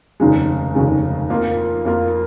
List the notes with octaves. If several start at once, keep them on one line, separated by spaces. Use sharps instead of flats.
F1 D#2 C#3 G#3
F1 D#2 C#3 G#3
F2 F3 A#3 F4 A#4
F2 F3 A#3 F4 A#4